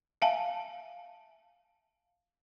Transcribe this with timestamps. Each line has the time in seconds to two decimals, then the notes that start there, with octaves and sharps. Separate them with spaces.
0.22 E5 F5 G#5 A5